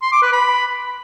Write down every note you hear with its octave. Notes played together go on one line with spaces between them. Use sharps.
C6
D6
B4
B5